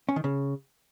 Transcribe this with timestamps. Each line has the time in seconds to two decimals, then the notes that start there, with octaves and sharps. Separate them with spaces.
0.09 C#4
0.16 D#3
0.24 C#3